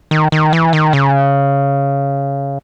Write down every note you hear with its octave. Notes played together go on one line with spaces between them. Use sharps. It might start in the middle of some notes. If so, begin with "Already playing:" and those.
D#3
D#3
E3
D#3
C#3